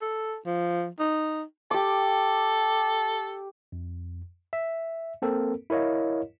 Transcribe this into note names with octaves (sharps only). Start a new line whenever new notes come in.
A4
F3
D#4
G4 A4 D6
F2
E5
A#3 C4 A4 A#4
E4 A#4 C#5 D#5 F5